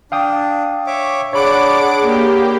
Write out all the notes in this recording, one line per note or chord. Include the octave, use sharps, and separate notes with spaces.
D4 F5 G5 D#6
C#5 E5 D6
D4 G#4 C#5 D5 F#5 B5 D6 D7
A#3 G4